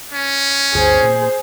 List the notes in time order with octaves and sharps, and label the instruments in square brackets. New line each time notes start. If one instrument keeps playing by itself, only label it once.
[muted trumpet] C#4
[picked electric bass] G1 D2 [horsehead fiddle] G#4 C5
[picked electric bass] A#2